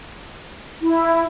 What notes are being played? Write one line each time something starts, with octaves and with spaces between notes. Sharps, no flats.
E4